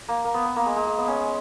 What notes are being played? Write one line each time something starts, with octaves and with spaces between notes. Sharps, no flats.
A#3
A#3
B3
B3
A#3
G#3
G#3
G#3
B3
C#4